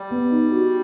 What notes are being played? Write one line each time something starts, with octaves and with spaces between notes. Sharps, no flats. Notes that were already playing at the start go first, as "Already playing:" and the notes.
Already playing: G3
B3
D#4
F#4